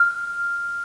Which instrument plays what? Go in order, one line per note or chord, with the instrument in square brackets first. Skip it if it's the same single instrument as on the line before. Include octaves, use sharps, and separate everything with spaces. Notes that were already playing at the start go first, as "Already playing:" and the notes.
Already playing: [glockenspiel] F6